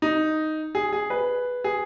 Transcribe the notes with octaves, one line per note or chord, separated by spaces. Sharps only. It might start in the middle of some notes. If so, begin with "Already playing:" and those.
D#4
G#4
G#4
B4
G#4